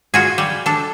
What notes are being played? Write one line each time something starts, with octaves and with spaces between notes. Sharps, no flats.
F4 F#4 G#4
G3
D4 A4